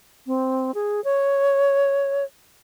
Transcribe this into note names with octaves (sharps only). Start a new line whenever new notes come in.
C4
G#4
C#5